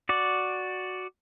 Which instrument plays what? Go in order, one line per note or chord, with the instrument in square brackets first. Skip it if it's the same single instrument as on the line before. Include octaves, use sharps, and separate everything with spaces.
[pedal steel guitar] F#4 D5